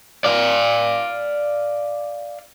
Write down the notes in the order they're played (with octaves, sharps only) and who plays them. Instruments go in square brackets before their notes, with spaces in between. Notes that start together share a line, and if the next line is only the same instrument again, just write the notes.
[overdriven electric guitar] D5 F5